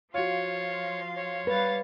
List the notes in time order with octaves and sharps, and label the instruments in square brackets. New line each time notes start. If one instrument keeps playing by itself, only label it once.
[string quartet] F3 F5 C6 [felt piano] F4 F#4 [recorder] C#5
[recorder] C#5
[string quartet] G3 F5 A6 [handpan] B4